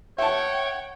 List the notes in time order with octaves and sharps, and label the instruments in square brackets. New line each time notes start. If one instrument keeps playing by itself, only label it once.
[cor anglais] C#5 [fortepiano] E5 A5 [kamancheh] F#5 G5